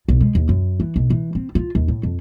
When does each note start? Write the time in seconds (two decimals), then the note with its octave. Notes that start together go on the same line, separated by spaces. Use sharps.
0.08 B1
0.21 G#3
0.35 D#2
0.49 F#2
0.80 E3
0.96 B1
1.10 E3
1.35 C4
1.55 F4
1.75 D#2
1.88 A2
2.03 F2